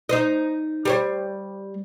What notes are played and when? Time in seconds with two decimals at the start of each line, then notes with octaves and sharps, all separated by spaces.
0.09 D#4 C5 D#5
0.85 G3 C5 C#5